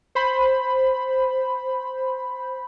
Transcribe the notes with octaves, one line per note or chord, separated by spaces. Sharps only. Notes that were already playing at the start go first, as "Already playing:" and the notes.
C5 B5